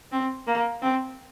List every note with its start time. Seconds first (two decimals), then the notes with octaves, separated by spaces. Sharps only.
0.12 C4
0.47 A#3
0.82 C4